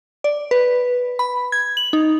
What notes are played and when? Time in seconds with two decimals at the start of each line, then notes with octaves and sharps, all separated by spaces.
0.24 D5
0.51 B4
1.19 B5
1.52 G#6
1.77 F#7
1.93 D#4